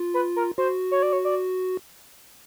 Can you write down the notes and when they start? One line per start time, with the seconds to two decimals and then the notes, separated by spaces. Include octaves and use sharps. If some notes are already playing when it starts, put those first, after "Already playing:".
Already playing: F4
0.14 B4
0.36 A#4
0.58 F#4 C5
0.91 C#5
1.03 D5
1.13 C#5
1.25 D5